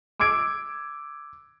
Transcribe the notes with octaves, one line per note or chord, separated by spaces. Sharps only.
D6 E6 G#6 D7